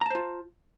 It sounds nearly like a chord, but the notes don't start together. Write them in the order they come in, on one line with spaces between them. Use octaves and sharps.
A#5 A5 C5 F4